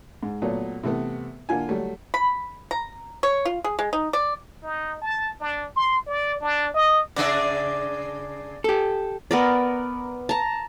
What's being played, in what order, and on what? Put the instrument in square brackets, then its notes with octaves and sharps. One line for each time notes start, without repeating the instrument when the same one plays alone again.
[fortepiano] G#2
A#2 F#3 A3 B3
C3 E3 A3 B3
D3 A#3 F4 G#5
F#3 G3 A3
[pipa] B5
A#5
C#5
F4
G#4
G#3
D#4
D5
[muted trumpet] D#4
A5
D4
C6
D5
D4
D#5
[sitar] C#3 D4 G#4 [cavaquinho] D5 E5
[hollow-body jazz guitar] G4 A4
[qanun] B3 A#4 D5
A5 A#5